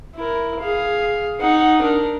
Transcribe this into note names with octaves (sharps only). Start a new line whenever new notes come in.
E4 A#4
G#4 F5
D#4 F#5
D4 A#4